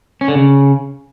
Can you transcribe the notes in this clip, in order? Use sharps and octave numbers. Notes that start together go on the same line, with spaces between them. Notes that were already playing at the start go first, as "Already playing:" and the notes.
C#4
D3
C#3